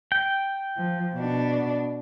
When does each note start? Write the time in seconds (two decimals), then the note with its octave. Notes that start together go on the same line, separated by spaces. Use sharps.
0.12 G5
0.77 F3
1.14 B2 D4